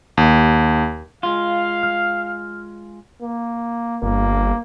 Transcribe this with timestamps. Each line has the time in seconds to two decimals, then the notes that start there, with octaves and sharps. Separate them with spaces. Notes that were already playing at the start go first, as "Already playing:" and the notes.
0.17 D#2
1.23 G#3 F4 F5
1.83 F6
3.23 A#3
4.03 G1 A#3